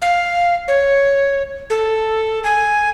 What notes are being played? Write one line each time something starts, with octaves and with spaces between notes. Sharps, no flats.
F5
C#5
A4
G#5